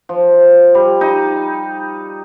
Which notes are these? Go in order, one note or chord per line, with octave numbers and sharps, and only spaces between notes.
F3
G3
D#4